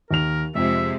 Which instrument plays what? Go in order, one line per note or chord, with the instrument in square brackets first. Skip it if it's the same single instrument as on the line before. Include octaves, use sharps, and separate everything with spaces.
[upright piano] D#2 F7 [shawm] A#4
[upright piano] F2 [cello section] C3 G#3 [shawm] E5